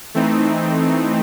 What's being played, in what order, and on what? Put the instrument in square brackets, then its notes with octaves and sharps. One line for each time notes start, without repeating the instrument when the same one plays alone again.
[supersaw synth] E3 A3 C4 D#4